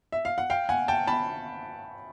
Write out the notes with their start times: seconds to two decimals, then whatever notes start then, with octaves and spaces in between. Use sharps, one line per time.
0.12 E5
0.25 F5
0.38 F#5
0.50 F5 G5
0.69 F#5 G#5
0.88 G5 A5
1.07 A5 B5